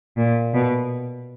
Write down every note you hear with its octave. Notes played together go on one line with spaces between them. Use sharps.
A#2
B2